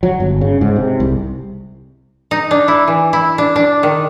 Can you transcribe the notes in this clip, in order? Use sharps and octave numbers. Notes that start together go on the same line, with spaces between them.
F#3
G1
C#3
G#2
C3
C2
D#4
D4
E4
E3
E4
D4
D4
D#3